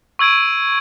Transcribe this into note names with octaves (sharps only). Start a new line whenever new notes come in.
C#6 E6 G#6 D7 D#7